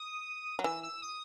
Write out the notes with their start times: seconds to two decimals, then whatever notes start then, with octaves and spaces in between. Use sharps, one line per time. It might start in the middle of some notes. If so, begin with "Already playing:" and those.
Already playing: D#6
0.59 F#3
0.64 E3 E6
0.83 E6
1.02 D#6